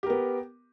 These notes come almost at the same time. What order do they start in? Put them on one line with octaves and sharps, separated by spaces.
G4 A#4 B3